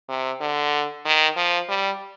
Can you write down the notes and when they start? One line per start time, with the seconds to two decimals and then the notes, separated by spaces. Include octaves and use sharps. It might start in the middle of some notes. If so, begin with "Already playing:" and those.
0.09 C3
0.40 D3
1.05 D#3
1.36 F3
1.69 G3